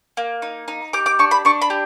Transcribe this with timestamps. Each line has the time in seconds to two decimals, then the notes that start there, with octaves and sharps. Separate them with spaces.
0.17 A#3
0.42 D#4
0.68 D#4
0.93 G4 D6
1.06 D6
1.19 D4 C#6
1.31 B5
1.45 D4 C#6
1.62 B5
1.70 G4